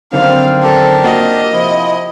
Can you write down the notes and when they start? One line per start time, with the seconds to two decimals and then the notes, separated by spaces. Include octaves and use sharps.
0.13 F#2 D3 D#3 G3 A#3 C4 F5
0.63 D4 G4 A4 A#4
1.04 A#3 F4 F#4 D#5
1.53 C3 F3 E4